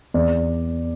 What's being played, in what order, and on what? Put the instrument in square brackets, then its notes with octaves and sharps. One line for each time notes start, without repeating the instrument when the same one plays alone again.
[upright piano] E2 D5